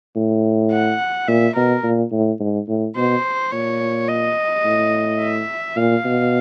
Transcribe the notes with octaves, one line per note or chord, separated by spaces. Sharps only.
A2
F#5
A#2 E5
B2 A#4
A#2
A2
G#2
A2
B2 C5
A#2 C#5
D#5
A2
E5
A#2 F5
B2